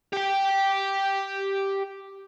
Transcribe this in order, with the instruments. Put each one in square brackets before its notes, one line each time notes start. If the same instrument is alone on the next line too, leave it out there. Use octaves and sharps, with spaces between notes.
[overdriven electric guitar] G4 G5